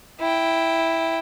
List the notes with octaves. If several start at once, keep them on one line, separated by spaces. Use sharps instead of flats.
E4 G5